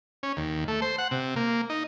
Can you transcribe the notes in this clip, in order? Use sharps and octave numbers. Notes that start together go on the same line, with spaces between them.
C#4
D#2
A3
C5
F#5
C3
A#3
D#4